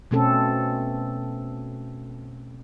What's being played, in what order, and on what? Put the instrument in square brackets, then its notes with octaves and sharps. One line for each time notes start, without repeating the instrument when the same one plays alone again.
[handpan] B2 A3 C4 C#4 A4